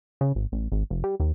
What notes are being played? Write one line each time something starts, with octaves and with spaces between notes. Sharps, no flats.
C#3
G#1
A1
G#1
F1
G3
D#2